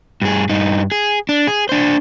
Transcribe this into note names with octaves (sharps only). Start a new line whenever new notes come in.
G2 G#4
G2 D#4
G#4
D4
G#4
D4 C5